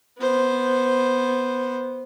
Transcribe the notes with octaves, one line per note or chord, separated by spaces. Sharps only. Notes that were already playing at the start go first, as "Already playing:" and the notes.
B3 C5